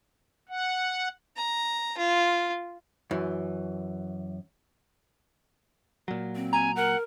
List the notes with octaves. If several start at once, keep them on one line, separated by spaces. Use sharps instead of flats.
F#5
A#5
F4
F#2 E3
A#2 F#3
C4
G#5 A#5
A#4 F#5